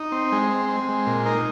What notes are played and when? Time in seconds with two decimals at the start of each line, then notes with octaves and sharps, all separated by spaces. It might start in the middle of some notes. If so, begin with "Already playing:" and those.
Already playing: D#4
0.12 C4
0.32 G#3
0.50 C4
0.69 C4
0.89 G#3
1.07 A#2
1.26 D#4 A#4